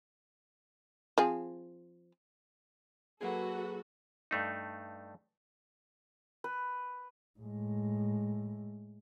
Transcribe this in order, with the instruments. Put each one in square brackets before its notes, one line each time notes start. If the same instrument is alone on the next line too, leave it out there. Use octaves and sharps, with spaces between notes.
[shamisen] F3 C4 G#4
[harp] F#3 A#3 G#4 [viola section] F#4 A4 [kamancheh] B4 F#5
[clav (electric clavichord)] G2 A3 D#4
[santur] B4
[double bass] A2 G#3